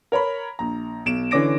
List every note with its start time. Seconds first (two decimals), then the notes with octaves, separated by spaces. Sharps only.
0.12 A#4 C#5 A#5 B5
0.59 A#1 A#5
1.06 B1 D7 E7
1.31 D3 E3 C#4 D6 A#6 D7